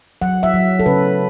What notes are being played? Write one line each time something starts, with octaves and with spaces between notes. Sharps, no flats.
F#3 F#5
E5
F#3
A4
C#3 B4